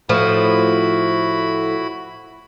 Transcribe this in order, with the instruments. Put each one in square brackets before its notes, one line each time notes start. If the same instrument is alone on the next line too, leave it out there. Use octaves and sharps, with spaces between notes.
[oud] A2 F3 [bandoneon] E4 F#4 B5